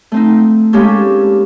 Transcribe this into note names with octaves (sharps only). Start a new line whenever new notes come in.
A3 C4 D#4
G#3 A#3 C#4 G4 A4